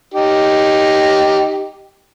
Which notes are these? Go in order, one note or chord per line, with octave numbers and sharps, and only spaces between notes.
D#4 G4